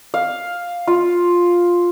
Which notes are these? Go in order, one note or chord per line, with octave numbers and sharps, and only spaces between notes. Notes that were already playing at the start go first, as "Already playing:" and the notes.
F5
F4